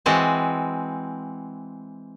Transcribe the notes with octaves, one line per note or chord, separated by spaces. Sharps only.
E3 G#3 C4 F#4 A5